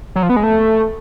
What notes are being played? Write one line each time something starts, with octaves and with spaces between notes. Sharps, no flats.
F#3
F3
B3
G#3
A3